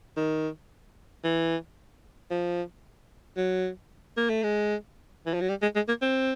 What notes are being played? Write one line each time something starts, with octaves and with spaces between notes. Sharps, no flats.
D#3
E3
F3
F#3
A#3
A3
G#3
E3
F3
F#3
G3
G#3
G#3
A#3
C4